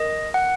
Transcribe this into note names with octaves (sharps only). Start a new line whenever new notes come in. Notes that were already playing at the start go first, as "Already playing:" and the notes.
Already playing: A#4 D#5
F#5